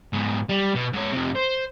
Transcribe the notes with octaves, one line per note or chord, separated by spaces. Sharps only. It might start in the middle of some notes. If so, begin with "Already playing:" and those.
G#2 B3
G3
B2
G#2 C#5
F2 C3
C5